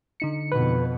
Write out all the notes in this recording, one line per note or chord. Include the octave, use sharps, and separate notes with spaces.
D3 D#4 C#7
F2 B2 B4